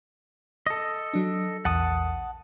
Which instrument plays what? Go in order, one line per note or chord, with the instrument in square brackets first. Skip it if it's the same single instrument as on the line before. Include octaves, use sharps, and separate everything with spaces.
[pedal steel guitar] A4 D#5
[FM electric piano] F#3 D4
[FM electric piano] A#1 E2 [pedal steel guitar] F#5 A5 D#6